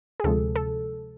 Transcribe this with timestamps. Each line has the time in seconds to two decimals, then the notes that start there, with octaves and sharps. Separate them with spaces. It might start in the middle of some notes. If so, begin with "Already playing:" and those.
0.20 G#4
0.24 D2 C3 F3 G#3 A4
0.56 A4